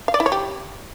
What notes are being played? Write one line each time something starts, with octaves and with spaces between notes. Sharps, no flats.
F5
D5
E4
C#5
G4